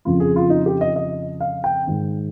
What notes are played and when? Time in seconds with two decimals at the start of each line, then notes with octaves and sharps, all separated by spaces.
0.05 F2 C#3 F3 F4
0.20 G#4
0.36 F4
0.50 D#4
0.66 G4
0.81 D#5
0.96 D#5
1.40 F5
1.64 G5
1.87 G#2 D#3